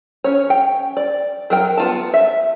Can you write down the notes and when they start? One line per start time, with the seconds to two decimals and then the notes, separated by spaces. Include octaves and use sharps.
0.24 C#4 C#5
0.50 G5
0.97 D5
1.50 F#3 A#4 G5
1.78 B3 F4 A5
2.14 E5